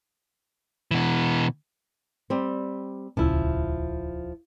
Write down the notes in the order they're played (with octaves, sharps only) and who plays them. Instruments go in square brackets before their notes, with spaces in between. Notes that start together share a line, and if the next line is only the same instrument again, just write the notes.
[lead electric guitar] B2 E3
[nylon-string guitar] G3 C4
[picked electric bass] D#1 C#2 C#4 [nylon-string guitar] F3 E4